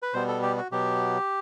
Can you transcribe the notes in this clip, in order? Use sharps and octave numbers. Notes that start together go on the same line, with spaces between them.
B4
B2 G3 B3 C5
A4
G4
F#4
B2 F#3 B3 G4